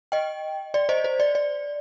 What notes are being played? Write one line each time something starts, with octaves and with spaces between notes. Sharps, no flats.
D#5 G5
D5
C5 D#5
C5
D5
D5